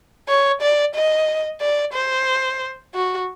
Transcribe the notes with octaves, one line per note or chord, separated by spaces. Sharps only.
C#5
D5
D#5
D5
C5
F#4